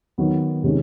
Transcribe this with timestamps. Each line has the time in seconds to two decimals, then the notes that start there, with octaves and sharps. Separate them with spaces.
0.18 D#3 F#3 B3
0.63 C3 D#3 G#3 C#4